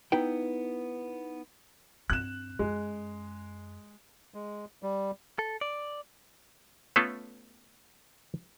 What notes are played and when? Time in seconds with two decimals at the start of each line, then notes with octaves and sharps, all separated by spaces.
0.12 B3 D#4 E4 B4 G5
2.10 G2 C4 F#6 E7
2.59 F#2 G#3
4.34 G#3
4.83 G3
5.39 A4
5.61 D5
6.96 A3 B3 C#4 F4 A4